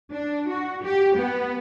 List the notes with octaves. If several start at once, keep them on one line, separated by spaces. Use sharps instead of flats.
D4
F#4
G4
B3